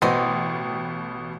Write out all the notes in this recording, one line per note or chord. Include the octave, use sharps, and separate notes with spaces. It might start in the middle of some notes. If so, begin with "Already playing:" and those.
A1 B2 B3 C4 D#5